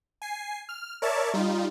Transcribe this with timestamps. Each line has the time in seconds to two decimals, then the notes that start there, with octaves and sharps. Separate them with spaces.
0.22 G#5 C7
0.69 F6
1.02 A#4 C#5 D5 E5 A5
1.34 G3 D#4 F4